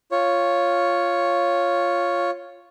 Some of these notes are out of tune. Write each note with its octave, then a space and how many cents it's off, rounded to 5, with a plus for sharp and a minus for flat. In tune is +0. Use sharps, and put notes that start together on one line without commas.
F4 +0 C#5 +0